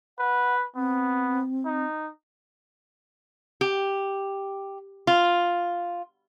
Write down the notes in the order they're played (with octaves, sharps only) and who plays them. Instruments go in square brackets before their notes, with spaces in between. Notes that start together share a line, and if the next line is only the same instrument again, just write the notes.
[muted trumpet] B4 [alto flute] F#5
[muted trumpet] B3 [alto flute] C4
[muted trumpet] D#4
[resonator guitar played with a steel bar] G4
F4